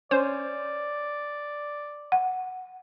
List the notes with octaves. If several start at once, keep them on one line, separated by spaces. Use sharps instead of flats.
C#4 C5 D5
F#5